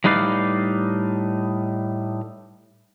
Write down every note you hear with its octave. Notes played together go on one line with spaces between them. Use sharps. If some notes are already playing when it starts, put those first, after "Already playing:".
A2 G3 D#4 B4 D5 F5